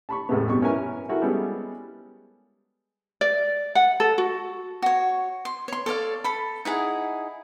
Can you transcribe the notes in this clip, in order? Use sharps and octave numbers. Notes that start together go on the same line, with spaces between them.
A5 B5 C#6
E2 A2 C3 G#3 A3 B3
G2 B2 C#6
C#4 E4 A#4 B4 G#5
E4 F#4 A4 A#4
G3 G#3 B3 C#4 A4
D5
F#5
A4
F#4
F#4 C#5
C6
C#5 C6
A4 C#5 D5 F5
A4 B5
D#4 E4 G#4 F#5